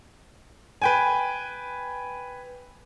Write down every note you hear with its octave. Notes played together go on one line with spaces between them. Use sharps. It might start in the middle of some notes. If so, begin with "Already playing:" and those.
B4 G5 G#5